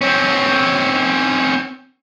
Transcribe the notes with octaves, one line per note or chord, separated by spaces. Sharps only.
C4 C#4